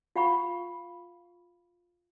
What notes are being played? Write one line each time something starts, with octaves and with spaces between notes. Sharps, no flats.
F4 F5 F#5 B5 C#6